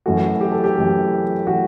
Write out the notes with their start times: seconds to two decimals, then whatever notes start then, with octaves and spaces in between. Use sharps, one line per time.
0.06 F#2 E3 A3 F#4
0.41 G4
0.52 A4
0.64 G4
0.75 F#2 E3 A3
1.47 E3 A3 F#4